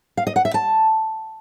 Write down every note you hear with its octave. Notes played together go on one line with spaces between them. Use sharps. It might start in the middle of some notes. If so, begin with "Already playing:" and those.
F5
D#5
F#5
E5
A5